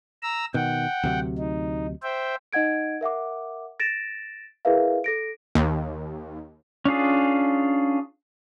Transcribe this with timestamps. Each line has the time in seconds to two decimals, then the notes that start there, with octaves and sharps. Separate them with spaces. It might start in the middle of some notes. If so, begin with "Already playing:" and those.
0.23 A#5 E6
0.54 B2 D#3 F#5 G5
1.03 D2 C3 F#3
1.38 D#4
2.03 C5 E5 G5
2.53 D#4 D#5 F#5 G#6 D7
3.01 A#4 E5 F#5 D6
3.80 A6 A#6 D7 E7
4.65 E4 G#4 A#4 B4 E5 F5
5.04 A4 A#6 D7
5.55 D#2
6.85 C#4 D4 F4 G#4